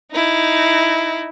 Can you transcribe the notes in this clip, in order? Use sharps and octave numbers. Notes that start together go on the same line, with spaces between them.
D#4 E4